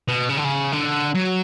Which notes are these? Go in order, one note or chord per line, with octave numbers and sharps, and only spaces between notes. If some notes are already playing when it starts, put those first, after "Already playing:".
B2
C#3
D3
C#3
D3
F#3